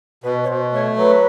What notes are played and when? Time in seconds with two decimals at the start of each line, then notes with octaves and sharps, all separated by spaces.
0.23 B2 B4
0.44 C#5
0.48 B2 C5
0.72 A3 C#5
0.97 F#3 B4